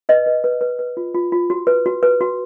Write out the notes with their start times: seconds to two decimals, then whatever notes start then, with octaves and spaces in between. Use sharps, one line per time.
0.09 B4 D#5
0.26 B4
0.44 B4
0.61 B4
0.79 B4
0.97 F4
1.14 F4
1.32 F4
1.50 F#4
1.67 B4
1.86 F#4
2.03 B4
2.21 F#4